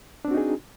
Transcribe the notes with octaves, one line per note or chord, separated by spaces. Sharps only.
C4 D4 D#4 F#4 G#4